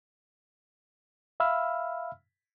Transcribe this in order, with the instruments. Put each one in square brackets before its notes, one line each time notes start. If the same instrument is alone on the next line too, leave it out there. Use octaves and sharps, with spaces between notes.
[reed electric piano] E5 F5 B5 E6 F6